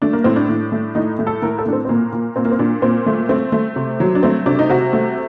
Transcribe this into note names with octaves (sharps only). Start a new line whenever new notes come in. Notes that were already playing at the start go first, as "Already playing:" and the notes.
A3 D4
A#3
A2 C4
D4
A2
A3
A2 D#4
A3
A4
A2 A#4
A4
A2 D4
C4
C4
A#2 A#3
A#2
A#2 C4
A#3
C4
A#2 D4
A#2 C4
A3
A3 C4
A3
C3
F#3
D4
A3 C4
C3 D4
D#4
C3 F#4
A3